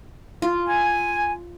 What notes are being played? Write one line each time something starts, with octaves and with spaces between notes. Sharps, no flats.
F4
G#5